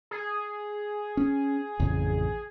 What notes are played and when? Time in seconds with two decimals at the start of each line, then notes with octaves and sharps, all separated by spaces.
0.11 G#4
1.17 C#4
1.79 A1 F2 C#3